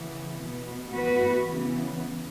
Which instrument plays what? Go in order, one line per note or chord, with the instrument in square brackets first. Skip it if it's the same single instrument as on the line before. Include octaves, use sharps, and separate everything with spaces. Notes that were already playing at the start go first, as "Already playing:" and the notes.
Already playing: [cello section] C#3 E3 B3
B2 B3
E3 B3 F#4 B4
C#3 E3 B3